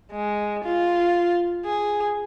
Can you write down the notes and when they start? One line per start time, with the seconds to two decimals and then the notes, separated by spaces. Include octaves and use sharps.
0.12 G#3
0.64 F4
1.65 G#4